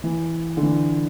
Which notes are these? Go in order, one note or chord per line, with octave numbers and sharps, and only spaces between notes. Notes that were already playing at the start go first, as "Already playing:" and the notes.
E3
D3
E3